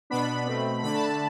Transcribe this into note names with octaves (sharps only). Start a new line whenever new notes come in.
B2 B3 D4 B5
B2 A3 C4
D3 A3 D4 B5
A5
B5